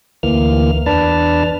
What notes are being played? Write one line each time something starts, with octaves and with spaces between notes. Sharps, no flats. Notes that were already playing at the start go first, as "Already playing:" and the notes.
D2 E3 A#3 F6
E2 D4 B4 A5 F6